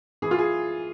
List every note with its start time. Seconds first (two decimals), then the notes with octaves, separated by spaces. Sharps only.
0.22 E3 G#4
0.31 F4
0.38 G#4